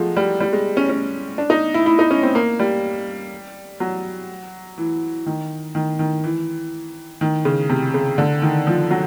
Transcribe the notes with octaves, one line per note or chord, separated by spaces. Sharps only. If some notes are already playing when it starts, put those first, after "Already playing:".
Already playing: F3 F#3 G#3 A3
G3
G3
G#3
C#4
C#4
D4
D#4
E4
E4
D#4
C#4
C4
A#3
G3
F#3
E3
D#3
D#3
D#3
E3
D#3
C#3
C3
C#3
D3
D#3
F3
F#3